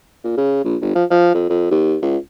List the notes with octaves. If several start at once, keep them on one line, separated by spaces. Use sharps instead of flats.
A#2
C#3
A#1
G1
F3
F3
F2
F2
D#2
C#2